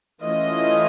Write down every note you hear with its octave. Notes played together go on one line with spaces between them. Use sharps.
E3 A3 C#4 F4 D#5